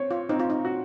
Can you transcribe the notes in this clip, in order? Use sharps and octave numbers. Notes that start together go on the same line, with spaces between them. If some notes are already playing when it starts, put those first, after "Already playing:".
Already playing: C4 C#5
F4
C4 D#4
F4
D#4
F#4